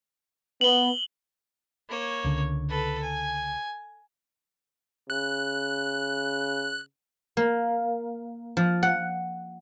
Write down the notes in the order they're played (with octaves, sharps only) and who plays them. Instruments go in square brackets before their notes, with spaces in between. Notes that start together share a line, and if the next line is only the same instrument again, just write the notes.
[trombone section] B3 [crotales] F#7 G7
[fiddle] A#3 C#5
[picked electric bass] C#2 D3
[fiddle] A4 B4
G#5
[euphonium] C#3 [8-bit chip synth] F#6
[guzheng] A#3
F3
F#5